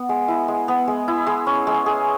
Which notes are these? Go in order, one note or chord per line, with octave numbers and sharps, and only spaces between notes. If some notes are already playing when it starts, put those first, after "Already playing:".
Already playing: B3
G#3
E4
G#3
B3
G#3
E4
G#3
C#4
G#3
G#4